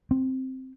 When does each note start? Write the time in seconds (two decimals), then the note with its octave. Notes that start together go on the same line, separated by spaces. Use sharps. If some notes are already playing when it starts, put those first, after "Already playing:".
0.11 C4